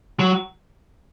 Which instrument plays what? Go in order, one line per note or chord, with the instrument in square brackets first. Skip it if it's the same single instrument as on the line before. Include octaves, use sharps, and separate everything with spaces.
[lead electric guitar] F#3